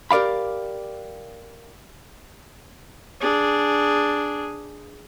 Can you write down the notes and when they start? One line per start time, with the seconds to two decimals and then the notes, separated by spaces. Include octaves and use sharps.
0.11 G4 A#4 D5 F5 B5
3.21 D4 G#4